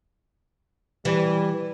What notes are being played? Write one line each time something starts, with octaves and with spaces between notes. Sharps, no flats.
E3 G3